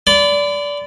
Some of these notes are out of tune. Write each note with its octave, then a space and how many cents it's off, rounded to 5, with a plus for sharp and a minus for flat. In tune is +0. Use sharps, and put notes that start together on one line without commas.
D5 -20 B5 +40